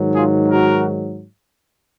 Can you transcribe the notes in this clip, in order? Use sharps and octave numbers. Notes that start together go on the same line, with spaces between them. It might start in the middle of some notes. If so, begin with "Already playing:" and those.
Already playing: G#2 D#3 F#3
F4 G#4
F#4 A#4